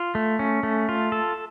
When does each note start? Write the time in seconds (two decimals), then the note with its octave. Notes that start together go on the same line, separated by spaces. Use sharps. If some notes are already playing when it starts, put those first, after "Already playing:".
Already playing: F4
0.15 A3
0.39 C#4
0.63 A3
0.89 F4
1.12 A4